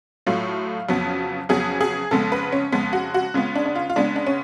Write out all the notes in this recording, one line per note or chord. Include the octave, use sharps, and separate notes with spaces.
A2 F#3 A3 F4
F2 C#3 F#3 B3
F2 C#3 F#3 B3 G#4
G#4
F2 C#3 G#3 B3 A4
B4
C#4
F2 C#3 G#3 B3
F#4
F#4
C#3 G#3 B3 F4
D4
D4
F4
F4
C#3 G#3 B3 D4
D4
C#4